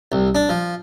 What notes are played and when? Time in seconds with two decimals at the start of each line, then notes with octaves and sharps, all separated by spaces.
0.12 C2
0.35 D4
0.49 F3